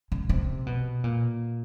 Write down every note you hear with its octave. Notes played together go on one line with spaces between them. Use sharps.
C#3
C3
B2
A#2